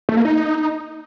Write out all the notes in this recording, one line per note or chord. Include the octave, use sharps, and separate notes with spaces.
A3
A#3
D#4